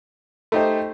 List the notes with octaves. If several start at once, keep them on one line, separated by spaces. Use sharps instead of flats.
A3 D#4 G4 C5